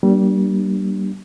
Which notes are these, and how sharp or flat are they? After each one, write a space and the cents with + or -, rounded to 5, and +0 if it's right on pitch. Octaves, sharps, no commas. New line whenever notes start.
G3 -25 A#3 +20 D4 +0